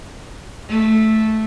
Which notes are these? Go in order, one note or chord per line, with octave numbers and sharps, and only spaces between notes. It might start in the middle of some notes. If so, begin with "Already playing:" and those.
A3